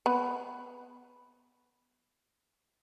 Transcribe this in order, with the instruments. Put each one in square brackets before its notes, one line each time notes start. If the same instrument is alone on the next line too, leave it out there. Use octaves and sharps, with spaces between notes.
[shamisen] B3 B4